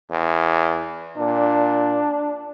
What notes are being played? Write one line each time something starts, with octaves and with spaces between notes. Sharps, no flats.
E2
A#2 D4